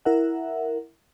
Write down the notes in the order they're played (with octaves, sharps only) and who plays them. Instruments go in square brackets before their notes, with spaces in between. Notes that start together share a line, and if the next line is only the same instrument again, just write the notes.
[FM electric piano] E4 A#4 E5 F#5